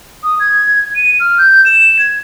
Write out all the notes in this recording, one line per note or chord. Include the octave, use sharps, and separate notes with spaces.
D#6
G#6
D#7
F6
G6
E7
G#6